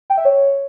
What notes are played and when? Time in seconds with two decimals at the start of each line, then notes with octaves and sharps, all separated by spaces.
0.10 G5
0.17 E5
0.25 C#5